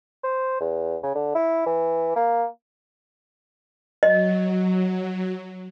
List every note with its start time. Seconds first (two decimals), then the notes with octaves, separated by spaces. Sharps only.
0.24 C5
0.61 E2
1.03 C#3
1.15 D3
1.35 E4
1.66 E3
2.16 A#3
4.03 F#3 D#5